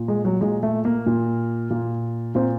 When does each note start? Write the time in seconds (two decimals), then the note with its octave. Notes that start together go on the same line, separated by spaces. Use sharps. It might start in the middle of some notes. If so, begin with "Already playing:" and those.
Already playing: A#2
0.08 G#3
0.25 F#3
0.41 A#2 G#3
0.63 A3
0.85 A#3
1.06 A#2
1.70 A#2
2.35 A#2 C4